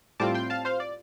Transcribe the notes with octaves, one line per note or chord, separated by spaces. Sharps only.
A2 G3 C4 F4 A5 D6
G5 C6
F5 A5
C5 F5
D5